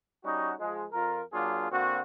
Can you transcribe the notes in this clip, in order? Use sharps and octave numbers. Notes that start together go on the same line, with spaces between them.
G3 C#4 D#4 F#4
F3 G#3
F2 F4 A#4
F#3 A#3 D4 F4 G#4
D3 A#3 C4 F#4